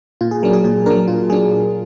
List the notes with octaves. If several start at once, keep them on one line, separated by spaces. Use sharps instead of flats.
A#2 F4
G#4
F#3 D4 A#4
G#4
A#2 G#4
F#3 D4 A#4
A#2 F4
F#3 D4 G#4